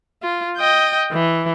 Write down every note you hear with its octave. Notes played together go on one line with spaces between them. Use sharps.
F4
D#5 G5
E3